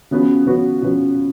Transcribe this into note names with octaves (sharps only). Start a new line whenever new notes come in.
C#3 F3 B3 F#4 B4
C#3 F3 B3 F#4 B4
C#3 F3 B3 F#4 B4